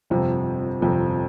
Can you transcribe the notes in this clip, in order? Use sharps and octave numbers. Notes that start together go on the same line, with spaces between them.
G1 F2 C3 F3
G1 F2 C3 F3